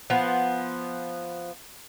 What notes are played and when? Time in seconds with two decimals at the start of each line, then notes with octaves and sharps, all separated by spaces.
0.10 F3 B3